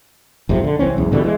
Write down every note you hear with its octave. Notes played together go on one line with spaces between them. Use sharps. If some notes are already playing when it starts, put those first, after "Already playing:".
B1 F2 G#2 C3
D3
C2 E3 C4 C#4
B1 E2 G#2
B2 D3 E3 G3
E3 G#3